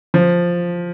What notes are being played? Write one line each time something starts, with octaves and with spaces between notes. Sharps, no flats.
F3